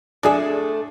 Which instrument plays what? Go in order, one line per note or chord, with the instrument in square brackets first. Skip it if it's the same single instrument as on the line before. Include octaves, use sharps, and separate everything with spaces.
[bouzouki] A2 A3 E5 [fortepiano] D4 G#4